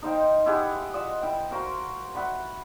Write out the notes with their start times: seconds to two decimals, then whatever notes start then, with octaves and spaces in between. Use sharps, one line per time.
0.02 D#4 C5 F5 G5
0.46 E4 G4 G#4 F#5
0.94 F4 D#5 F#5 E6
1.22 E4 G5
1.51 F#4 A#4 C5 F5
2.15 E5 F#5 B5